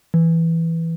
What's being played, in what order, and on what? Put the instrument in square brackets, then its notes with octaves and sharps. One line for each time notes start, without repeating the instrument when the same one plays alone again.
[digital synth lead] E3